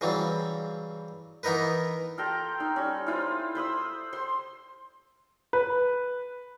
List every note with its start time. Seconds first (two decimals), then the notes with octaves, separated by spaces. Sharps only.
0.01 C#3 E3 F#3 G3 C4
1.43 E3 B3 D#4 A#4 B4
2.18 F4 A4 G5 A#5
2.60 D#4
2.76 G3 C#4
3.07 E4 F4 C5
3.55 C5 B5 D#6 E6
4.13 C5 C6
5.53 B4